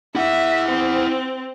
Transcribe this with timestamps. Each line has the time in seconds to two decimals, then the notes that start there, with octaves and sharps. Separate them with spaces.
0.15 E4 E5 F#5
0.69 C4